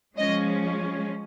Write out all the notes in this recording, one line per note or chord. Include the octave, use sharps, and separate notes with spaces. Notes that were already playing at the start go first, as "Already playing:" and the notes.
F3 G#3 C#4 D#5